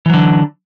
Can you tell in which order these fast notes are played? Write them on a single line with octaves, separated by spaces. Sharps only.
E3 F#3 D3